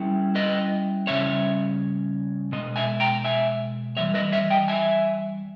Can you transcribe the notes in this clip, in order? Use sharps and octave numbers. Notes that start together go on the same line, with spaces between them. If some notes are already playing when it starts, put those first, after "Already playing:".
Already playing: G3 C#4 E4
B4 D#5
C#3 G3 C#4 C#5 E5
B2 G#3 D#5
E5 G#5
G5 A#5
E5 G#5
E3 G3 C#5 E5
B4 D#5
C#5 E5
D#5 G5
E5 G#5